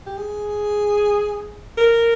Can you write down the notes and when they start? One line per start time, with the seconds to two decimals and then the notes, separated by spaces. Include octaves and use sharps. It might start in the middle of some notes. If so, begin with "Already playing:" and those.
0.07 G4
0.17 G#4
1.78 A#4